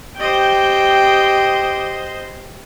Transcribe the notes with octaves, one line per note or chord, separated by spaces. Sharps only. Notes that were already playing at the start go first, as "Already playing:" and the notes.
G4 C5 D#5 G5